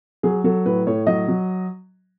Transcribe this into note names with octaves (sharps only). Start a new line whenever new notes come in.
F#3 G#4
F#3 A4
A2 B4
A2 C#5
F#3 D#5
F#3